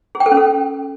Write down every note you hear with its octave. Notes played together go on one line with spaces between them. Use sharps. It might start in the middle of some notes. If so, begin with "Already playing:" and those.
G#4
G5
A4
C#4
A4